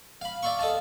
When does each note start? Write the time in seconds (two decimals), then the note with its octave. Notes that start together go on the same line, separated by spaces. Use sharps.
0.21 F5 B5
0.43 D5 E5 F5 C6 C#6
0.59 A4 D#5 F5 A5